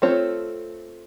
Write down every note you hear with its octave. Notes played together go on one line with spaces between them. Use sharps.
A3 C4 F4 A4 C#5